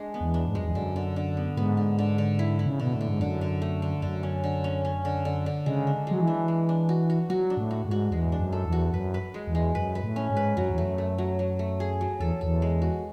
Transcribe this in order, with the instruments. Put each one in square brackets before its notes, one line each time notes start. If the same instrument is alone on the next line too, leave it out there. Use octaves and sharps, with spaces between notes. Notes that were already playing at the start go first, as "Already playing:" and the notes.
Already playing: [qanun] G#3 D4
B3
[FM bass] E2
[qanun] D4
[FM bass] G#2
[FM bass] F#2 [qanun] G#3
[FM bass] E2
[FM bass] F#2 [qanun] D3
[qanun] D3
D3
B3
[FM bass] G#2 [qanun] B3
[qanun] D3
D3
D3
E4
E4
[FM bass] C#3
[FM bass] B2 [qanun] D3
[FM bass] A2
[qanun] D3
[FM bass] G#2
[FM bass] F#2 [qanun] D3
[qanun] D3
A3
D3
[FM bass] F#2 [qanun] D3
[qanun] C#4
D3
C#4
C#4
D3
D3
D3
[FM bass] C#3 [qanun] G#3
[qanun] D4
[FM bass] F#3 [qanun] G#3
[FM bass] E3
[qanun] D4
G#3
D4
F#4
F#4
[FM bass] F#3 [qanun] F#4
[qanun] D4
[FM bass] A2
[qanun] F#4
[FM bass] G#2
[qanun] F#4
[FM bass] E2 [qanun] G#3
[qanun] D4
[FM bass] F#2
[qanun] A4
[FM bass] E2
[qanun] F#4
[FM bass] F#2 [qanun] B4
[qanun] B4
G#3
[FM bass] E2
[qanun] G#3
[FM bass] F#2 [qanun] B4
[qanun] B4
[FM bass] A2
[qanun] C#4
[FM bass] G#2
[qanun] B4
[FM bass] F#2 [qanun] F#3
[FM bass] E2
[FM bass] F#2 [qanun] A3
[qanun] A3
F#3
F#3
A3
G#4
F#3
[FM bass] E2 [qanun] A4
[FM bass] E2 [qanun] A4
[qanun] G#3
F#4